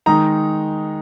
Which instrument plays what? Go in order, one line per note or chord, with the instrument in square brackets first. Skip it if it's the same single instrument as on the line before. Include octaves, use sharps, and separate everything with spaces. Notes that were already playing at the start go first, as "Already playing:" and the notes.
[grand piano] D#3 G#3 D#4 A#5